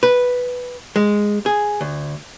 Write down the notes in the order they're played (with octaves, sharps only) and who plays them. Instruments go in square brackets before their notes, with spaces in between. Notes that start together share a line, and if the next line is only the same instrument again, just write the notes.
[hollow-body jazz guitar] B4
G#3
G#4
D2